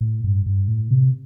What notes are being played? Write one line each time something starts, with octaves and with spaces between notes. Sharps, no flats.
A2
G2
G2
A2
C3